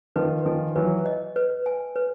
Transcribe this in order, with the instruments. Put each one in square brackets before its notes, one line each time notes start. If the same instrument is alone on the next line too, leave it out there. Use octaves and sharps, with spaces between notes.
[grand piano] D#3 F3 [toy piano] B4
[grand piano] D#3 F3 [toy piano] G#5
[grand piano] E3 F#3 [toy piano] B4
[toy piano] D#5
B4
G#5
B4